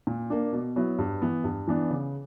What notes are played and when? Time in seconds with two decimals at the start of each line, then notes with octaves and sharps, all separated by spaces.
0.07 A#2
0.30 A#3 D4
0.52 B2
0.76 F#3 B3 E4
0.99 G2
1.22 E3 B3
1.44 G2
1.67 E3 B3 D4
1.90 C#3